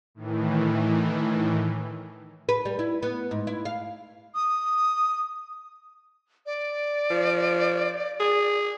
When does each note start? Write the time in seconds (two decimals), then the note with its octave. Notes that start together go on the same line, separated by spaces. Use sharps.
0.15 A2 D#3 E3
2.49 B4
2.65 G3
2.79 E4
3.03 B3
3.31 G#2
3.47 E4
3.65 F5
4.35 D#6
6.46 D5
7.10 F3
8.20 G#4